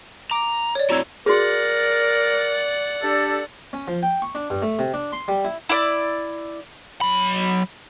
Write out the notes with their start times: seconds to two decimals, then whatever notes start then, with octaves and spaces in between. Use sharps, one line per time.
0.31 A#5 D6 D7
0.75 C#5 D5
0.90 C4 E4 F#4 A#5 E6 G#6
1.26 F#4 G#4 A#4 D5 F#5
3.02 D4 G4 A4
3.73 C#4
3.88 F3
4.03 G5
4.22 C#6
4.35 D4
4.50 G2
4.62 A3
4.79 C3
4.94 D4
5.12 C6
5.28 G3
5.45 E4
5.69 E4 D5
7.01 F#3 B5